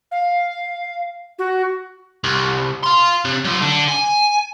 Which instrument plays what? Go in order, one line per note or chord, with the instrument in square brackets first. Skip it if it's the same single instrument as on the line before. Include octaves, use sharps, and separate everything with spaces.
[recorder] F5
F#4
[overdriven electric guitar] C2
F5 C6
C3
F#3 F4
D3
G#5